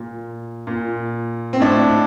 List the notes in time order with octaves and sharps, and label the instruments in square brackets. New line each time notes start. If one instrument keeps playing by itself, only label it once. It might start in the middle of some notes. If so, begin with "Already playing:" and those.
Already playing: [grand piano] A#2
A#2
C4
A2 D4